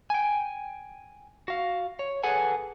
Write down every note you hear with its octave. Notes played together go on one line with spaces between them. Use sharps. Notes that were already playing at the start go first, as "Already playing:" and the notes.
G5 G#5
F#4 F5
C#5
G#4 A4 B4 F#5 G#5